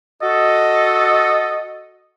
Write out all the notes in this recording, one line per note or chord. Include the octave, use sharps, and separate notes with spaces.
F#4 A4 D#5